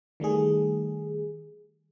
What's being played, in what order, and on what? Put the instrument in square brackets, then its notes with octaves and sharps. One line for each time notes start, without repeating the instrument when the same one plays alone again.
[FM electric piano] D#3 G3 A3 G#4